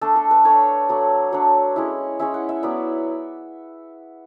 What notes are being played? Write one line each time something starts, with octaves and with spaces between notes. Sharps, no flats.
A3 D4 A4
A4
B4
A3 D4 C#5
F#3 A3 D4
F#3 A3 D4 C#5
G#3 C#4 E4
G#3 C#4 E4 E5
F#5
E5
F#3 B3 E4 D5